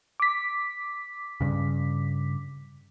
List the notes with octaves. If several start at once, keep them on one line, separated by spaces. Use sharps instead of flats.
D6 B6
G2 C#3